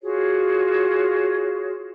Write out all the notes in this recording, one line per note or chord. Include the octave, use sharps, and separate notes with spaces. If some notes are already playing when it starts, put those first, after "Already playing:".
F4 F#4 G#4 C#5